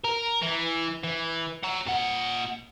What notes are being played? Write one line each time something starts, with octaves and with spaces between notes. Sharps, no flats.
A#4
E3
E3
F#5 A#5
A#2 F#5